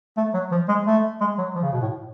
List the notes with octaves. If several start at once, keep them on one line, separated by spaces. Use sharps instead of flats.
A3
F#3
F3
G#3
A3
G#3
F#3
F3
C#3
B2
A2